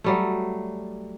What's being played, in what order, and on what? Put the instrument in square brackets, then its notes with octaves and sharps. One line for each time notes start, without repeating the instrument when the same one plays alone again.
[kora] F#3 G3 A3